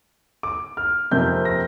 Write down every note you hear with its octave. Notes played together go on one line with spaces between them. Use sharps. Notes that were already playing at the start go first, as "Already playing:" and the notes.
D6
F6
F2 C3 A#3 G6
A#6